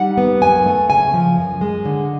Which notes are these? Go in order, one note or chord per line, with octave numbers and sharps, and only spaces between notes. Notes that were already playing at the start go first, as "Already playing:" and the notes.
Already playing: G3 D#4 F#5
B3
F#2 G#5
A3
C#3 G#5
F3
F#2
G#3
D3